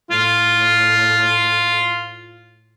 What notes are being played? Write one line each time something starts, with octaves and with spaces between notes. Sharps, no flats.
A2 F4